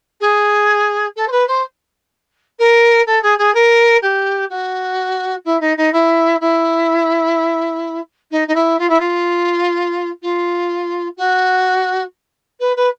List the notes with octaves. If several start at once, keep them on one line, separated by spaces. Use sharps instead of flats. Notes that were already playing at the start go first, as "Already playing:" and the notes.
G#4
A4
C5
B4
C5
A#4
A4
G#4
G#4
A#4
G4
F#4
E4
D#4
D#4
E4
E4
D#4
D#4
E4
F4
E4
F4
F4
F#4
B4
B4